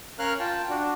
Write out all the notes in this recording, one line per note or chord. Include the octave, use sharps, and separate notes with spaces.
C#4 A#4 C#5 F5 F6 F#6
F4 G5 A5
D4 F#4